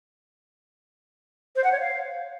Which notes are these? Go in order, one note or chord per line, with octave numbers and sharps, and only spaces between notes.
C5
F#5
C#5
F5